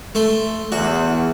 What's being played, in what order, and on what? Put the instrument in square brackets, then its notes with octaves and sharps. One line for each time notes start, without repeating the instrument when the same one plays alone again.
[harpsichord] A3 C6
[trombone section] E2 [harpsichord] F#4